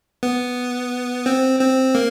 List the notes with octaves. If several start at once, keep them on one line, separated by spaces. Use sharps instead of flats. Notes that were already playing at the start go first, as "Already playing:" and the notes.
B3
C4
C4
A#3